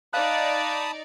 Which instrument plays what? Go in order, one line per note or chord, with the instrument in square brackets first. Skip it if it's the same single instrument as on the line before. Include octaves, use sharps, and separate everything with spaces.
[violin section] D#4 D5 [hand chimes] F5 F#6 [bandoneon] A5 B5 D#6